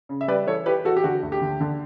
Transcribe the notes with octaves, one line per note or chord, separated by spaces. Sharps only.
C#3
E5
G3 B4 D5
E3 A4 C#5
E3 G4 B4
E3 F#4 A4
G4
D3 F#4
D2
G4
D3
D3